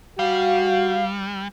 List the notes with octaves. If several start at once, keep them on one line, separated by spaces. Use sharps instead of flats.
G3 F#4 F5